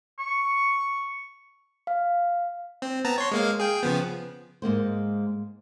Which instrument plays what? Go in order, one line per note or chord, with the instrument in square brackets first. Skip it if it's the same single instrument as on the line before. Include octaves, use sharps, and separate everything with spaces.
[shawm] C#6
[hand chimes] F5
[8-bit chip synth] C4
B3 A5 A#5
C#5 C6
G#3 A#3 F5
G#4 G5
C#3 F3 B3
[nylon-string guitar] G#2 G#3 A#3 C5